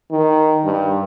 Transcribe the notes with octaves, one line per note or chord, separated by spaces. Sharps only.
D#3
G2